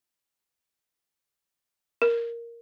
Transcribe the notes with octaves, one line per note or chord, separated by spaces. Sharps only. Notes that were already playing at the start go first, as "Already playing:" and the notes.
A#4